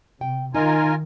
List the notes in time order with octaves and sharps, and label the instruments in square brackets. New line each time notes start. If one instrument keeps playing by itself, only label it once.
[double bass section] C3 [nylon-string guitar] G5
[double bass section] D#3 [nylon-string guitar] D#4 D#5 [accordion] F4 A#4 G#5